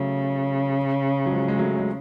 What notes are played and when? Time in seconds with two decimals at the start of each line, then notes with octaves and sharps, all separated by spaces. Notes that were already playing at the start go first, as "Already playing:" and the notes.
Already playing: C#3 F#3 A3
1.26 F#3
1.31 F3 G#3
1.48 G#3
1.59 F#3 A3
1.78 G#3